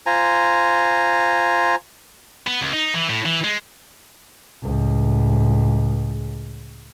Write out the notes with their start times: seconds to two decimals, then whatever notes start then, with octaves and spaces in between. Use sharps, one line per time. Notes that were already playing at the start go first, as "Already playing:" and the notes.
0.06 F4 C5 G#5 A#5
2.47 B3
2.62 C#2
2.73 D#4
2.95 E3
3.10 A2
3.25 E3
3.44 G#3
4.63 C#2 A2